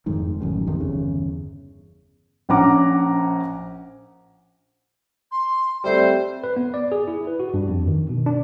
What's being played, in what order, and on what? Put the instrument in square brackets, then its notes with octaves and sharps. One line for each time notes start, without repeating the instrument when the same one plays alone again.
[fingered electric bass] F1 F2 G#2 D#3
A1 F#2 D#3
C2 F2 C3 D#3
G1 E2 C#3
[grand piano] A#1 C#4 F#5 A#5 D6
[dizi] C6
[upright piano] G3 A3 C4 [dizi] C5
[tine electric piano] B4
B3
D5
G#4
E4
B4
F#4
G2
F2
D#3
B2
D4